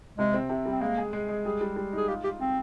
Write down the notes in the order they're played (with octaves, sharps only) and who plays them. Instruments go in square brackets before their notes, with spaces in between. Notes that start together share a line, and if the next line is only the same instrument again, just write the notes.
[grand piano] C3 [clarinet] G#3
[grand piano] C4
C3
G3
[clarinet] C4
[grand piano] G#3 [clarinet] A#3
[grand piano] G#4
G#3
G#3
[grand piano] G3 [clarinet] G#4
[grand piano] G3
G3
[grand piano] D#4 [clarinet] G#4
[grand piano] F4 [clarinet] G4
[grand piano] F4 [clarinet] G4
[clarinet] C4 [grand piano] F4